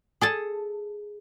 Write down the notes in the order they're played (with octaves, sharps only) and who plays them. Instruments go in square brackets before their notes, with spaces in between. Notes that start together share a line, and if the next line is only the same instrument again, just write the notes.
[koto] G#4 A4 A5